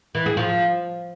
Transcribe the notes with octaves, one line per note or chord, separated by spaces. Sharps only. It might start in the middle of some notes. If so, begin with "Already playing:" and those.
E3
G#4
F3